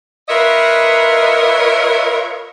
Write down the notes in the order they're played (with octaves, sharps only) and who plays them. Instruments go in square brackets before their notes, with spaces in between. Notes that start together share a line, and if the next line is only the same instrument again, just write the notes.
[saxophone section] F4 A#4 B4 C#5 D#5 E5